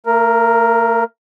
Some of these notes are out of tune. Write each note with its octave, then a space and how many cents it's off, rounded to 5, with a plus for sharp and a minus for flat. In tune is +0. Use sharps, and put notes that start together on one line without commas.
A3 +45 A#4 +0